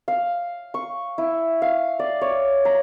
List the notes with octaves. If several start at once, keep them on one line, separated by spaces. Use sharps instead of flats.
F5
C#6
E4
F5
D5
C#5
A#5